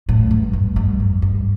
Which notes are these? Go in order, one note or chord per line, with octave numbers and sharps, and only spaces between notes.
A2
G2
G2
G2
F2
G2